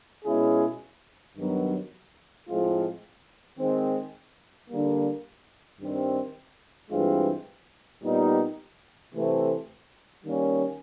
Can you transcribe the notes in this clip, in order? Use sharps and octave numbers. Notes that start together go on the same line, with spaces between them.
B2 G#3 C#4 E4 G#4
G2 D#3 F#3 B3
A2 F3 G#3 C4 F4
D#3 G#3 C4
D3 G3 A#3
G2 D#3 G3 C4
G2 E3 G#3 C4 F4
A#2 G3 B3 D#4 G4
C3 E3 A3 C4
D#3 G3 A#3 C#4